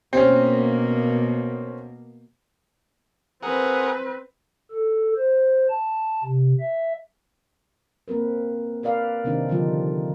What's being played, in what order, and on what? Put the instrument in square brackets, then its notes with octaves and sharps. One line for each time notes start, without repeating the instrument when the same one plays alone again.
[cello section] B2 A#3 [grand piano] C4 C#4
[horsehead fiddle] C4 B4 [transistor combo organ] G#4 A#4 F#5
[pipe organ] A4
C5
A5
C3
E5
[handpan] A#3 C4 A#4 B4
A#4 B4 D5 F5
C3 D#3 C4 D4 D#4
D3 F3 G3 D#4 F4